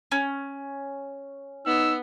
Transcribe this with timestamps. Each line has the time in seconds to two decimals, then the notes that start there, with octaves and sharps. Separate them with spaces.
0.12 C#4
1.66 B3 D#4 E6